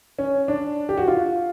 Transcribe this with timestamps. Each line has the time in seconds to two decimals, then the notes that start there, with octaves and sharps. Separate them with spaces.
0.19 C#4
0.48 D4
0.89 G4
0.98 F#4
1.08 F4